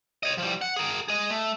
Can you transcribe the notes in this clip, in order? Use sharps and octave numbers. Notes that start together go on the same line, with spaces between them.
C#5 D#5
F3 G3
F#5
G#4 A#4
G#4 D#5
A3